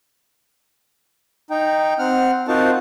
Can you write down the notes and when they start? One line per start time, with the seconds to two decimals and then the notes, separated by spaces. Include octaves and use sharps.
1.50 D#4 G5
1.99 C4 F#5 F6
2.48 C4 D#4 F4 F#4 A#4 A5